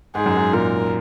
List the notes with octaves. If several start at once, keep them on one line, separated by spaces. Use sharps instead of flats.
G#2 G#4
F#2
G#2
A#2 A#4